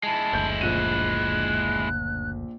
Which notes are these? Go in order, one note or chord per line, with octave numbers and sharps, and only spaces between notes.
G#3 E4 A5
F#1 D2 G6
A#1 F#6 D#7